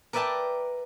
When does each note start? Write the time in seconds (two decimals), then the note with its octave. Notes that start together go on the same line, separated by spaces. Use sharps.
0.13 A#4 B4 D5 E5 G5 A5